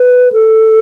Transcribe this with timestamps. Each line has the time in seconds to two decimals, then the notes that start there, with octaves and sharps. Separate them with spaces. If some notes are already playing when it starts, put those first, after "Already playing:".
Already playing: B4
0.32 A4